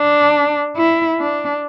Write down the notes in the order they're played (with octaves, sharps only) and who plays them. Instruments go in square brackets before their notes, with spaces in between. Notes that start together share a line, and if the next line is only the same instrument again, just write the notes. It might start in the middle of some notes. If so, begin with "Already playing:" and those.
Already playing: [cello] D4
E4
D4